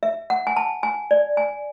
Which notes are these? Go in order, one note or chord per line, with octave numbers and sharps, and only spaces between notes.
E5
F#5
G#5
A5
G#5
D5
G#5